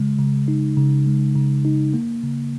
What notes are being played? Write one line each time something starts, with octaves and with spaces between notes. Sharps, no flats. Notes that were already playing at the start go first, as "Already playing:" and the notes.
Already playing: C#3 G#3
C#3
D#4
C#3
G#3
C#3
D#4
A#3
C#3